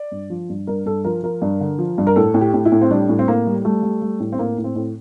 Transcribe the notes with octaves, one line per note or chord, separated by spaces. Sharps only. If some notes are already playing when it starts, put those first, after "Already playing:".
Already playing: D5
G2
F3
G2
G2 A#4
G2 A4
F3 A#4
F3 A#4
G2
D3
F3
G2
A#4
A2 A4
A2
G4
A2
E4
A2
C4
G3 D4
A2
C4
A2 A#3
G3
G3 A3
G3
G3
A2
C4
A2 A#3
A2
C4
A2